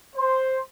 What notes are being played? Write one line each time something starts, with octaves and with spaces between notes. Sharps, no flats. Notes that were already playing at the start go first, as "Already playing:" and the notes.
C5